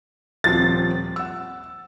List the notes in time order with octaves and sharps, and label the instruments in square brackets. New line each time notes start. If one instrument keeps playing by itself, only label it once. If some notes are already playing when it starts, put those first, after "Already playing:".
[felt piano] D#1 F3 C4 [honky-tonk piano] A6
[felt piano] F#5 E6